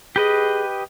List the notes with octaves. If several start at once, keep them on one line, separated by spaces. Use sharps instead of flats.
G4 G#4 B4 D#5